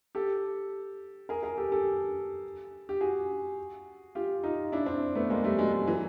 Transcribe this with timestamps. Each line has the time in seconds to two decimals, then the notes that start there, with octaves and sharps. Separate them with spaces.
0.15 G4 A4
1.29 G#4 A#4
1.43 G#4 A#4
1.58 G4 A4
1.72 G4 A4
2.89 G4
3.01 F#4 G#4
4.15 F4 G4
4.44 D#4 F4
4.72 D4 E4
4.86 C4 D4
5.15 A3 B3
5.30 G#3 A#3
5.44 G3 A3
5.58 F#3 G#3
5.72 F#3 G#3
5.87 E3 F#3